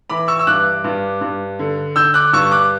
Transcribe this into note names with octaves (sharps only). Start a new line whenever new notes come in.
E3 B5 D6
C#6 E6
E6
G2 D6 F#6
G2
G2
D3
D3 E6 G6
D6 F#6
G2 C#6 E6
D6 F#6